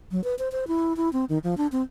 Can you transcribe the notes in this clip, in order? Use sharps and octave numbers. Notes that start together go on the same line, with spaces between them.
F#3
B4
C5
C5
E4
E4
C4
D#3
F3
D4
C4